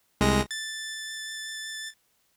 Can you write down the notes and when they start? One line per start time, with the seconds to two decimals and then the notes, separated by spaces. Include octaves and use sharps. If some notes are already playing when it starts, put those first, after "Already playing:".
0.21 C2 G#3 A#6
0.51 A6